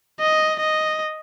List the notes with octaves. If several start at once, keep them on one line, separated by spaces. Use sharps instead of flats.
D#5
D#5